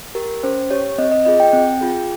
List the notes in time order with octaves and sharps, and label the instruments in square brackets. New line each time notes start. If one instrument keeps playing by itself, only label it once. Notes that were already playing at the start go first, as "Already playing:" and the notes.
[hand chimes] G4 A#4
C#4 C5
G4 C#5
C4 D#5
D#5
F4 G#4 D#5
G5
C4
F4 G#4